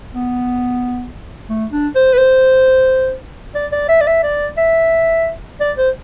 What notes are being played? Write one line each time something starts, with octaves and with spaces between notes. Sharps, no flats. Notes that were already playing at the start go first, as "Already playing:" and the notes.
B3
A3
D4
C5
B4
C5
D5
D5
E5
D5
E5
D5
E5
D5
C5